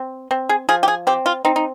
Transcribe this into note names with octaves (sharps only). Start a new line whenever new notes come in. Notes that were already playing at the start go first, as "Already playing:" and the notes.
Already playing: C4
C4
G#4
F3 G#4
G4
G#4
C4 G4
F4
C4 D#4
D#4